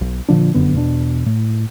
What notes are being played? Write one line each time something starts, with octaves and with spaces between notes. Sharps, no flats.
B1
A#2 D3 F3 D4
F1 F#2 D3 B3
E2 B2 E3 D4
A2